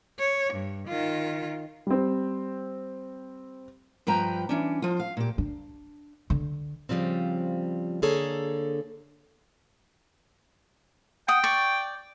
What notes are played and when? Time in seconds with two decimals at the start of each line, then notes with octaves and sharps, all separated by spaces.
0.19 C#5
0.54 G2
0.88 D#3 F4
1.87 G3 C4
4.07 G2 F3 B4 G5 A#5
4.49 E3 C#4 D4
4.82 F3 F4
5.00 F5
5.17 A#2 G4
5.38 D4
6.30 D3
6.89 C#3 E3 F3 G3 C4
8.02 D3 A#3 G#4 A4 C#5
11.28 F#5 G5 D#6
11.44 D5 C#6